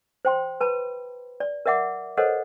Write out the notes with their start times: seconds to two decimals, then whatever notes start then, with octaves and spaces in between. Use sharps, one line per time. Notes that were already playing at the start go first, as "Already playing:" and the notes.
0.25 C5 G5 C6
0.61 B4 A5 B5
1.40 D5
1.66 A#4 D5 E5 F#5 D6
2.17 A4 A#4 C5 C#5 D#5 F#5